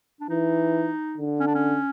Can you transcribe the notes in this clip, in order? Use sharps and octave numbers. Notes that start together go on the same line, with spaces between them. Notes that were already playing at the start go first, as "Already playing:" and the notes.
D4
E3 D#4
D3
C#4
D4
C#4